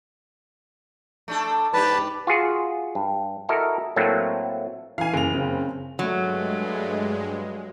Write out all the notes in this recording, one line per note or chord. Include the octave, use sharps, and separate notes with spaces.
A3 D4 A4
G#2 D4 G4 B4 A5
F4 F#4 G#4
G2
E4 F#4 A4 A#4 D#5 E5
A2 F#3 A3 A#3 C4
E3 F5 G#5
F#1 F7
C#3 C4
G2 F#3 G#3 A3